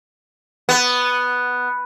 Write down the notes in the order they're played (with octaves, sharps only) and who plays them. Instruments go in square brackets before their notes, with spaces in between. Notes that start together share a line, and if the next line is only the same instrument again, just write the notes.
[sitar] B3